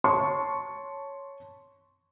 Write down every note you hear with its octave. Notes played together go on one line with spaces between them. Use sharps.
C#5 A5 C6 C#6